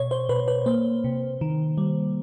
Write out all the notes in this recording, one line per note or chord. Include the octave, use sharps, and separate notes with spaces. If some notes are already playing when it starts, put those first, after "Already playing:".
Already playing: B2 C#5
C5
B2 B4
B4
A#3 C5
C3
D#3
G3